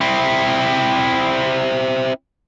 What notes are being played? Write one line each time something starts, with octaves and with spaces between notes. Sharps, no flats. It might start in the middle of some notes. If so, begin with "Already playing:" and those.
C4 E4